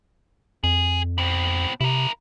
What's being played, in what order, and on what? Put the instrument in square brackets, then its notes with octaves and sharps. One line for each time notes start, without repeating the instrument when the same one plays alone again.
[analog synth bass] F2 [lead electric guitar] G#4
[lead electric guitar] B2 C4
[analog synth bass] C3 [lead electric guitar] E4 A#4